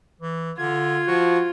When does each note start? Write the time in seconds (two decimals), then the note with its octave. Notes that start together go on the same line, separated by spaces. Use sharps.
0.21 E3
0.58 D3 F4 G#6
1.07 F3 F#4